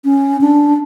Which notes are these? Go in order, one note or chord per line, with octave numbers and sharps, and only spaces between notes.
C#4
D4